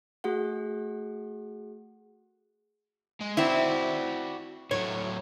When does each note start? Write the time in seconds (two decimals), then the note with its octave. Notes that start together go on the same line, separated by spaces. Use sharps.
0.24 A3 F#4 G#4 F#5
3.21 G#3
3.37 C4 E4 F#4 D5
4.71 A2 F#3 C#5